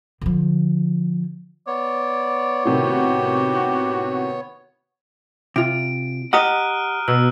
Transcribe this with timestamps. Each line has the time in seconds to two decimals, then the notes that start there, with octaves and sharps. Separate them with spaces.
0.21 D3 F3
1.67 B3 C#5 D5
2.65 A2 C3 D#3 F#4 G4
5.56 C3 F4 D7
6.33 G4 D#5 F#5 A#5 D#6 F6 F#6 D#7
7.08 B2 E6